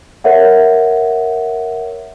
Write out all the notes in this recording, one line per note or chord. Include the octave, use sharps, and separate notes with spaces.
A#4 C#5 E5 F#5